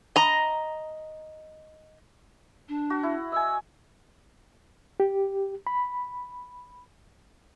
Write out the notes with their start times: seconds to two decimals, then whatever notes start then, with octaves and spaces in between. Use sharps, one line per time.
0.16 D#5 A#5
2.69 D4
2.90 F#4
3.03 E4
3.32 D#5 G#5 E6
5.00 G4
5.67 B5